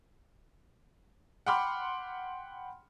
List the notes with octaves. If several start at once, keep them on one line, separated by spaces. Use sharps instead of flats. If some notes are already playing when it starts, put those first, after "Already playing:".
F#5 G5 B5 C6 D6 F6